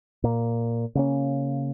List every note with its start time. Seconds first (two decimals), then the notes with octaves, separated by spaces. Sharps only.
0.24 A#2
0.95 C#3 A#3 C#4